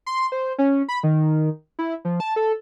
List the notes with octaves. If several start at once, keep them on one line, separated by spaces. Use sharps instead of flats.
C6
C5
C#4
B5
D#3
E4
F3
A5
A4